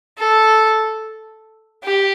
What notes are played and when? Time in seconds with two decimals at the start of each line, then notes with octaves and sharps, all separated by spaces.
0.18 A4
1.84 G4